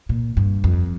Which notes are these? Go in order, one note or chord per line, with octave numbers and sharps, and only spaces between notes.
A#2
G2
F2